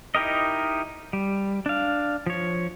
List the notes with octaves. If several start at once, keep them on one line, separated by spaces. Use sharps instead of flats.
D#4 E4 G4 A#4 D#5
G3
D4 F5
F3 C#5